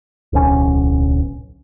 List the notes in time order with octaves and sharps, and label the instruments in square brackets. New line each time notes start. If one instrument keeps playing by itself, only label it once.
[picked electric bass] D1 B1 A2 C#4